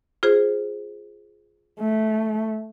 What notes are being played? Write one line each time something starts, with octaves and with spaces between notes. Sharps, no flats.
F4 G#4 C5
A3